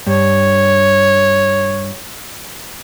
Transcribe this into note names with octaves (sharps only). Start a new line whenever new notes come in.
G2 C#5